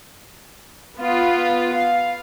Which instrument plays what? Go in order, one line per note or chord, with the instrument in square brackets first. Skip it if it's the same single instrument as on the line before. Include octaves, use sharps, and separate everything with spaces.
[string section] B3 F4
F5